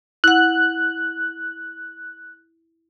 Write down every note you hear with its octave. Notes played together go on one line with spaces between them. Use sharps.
E4 F#5 F#6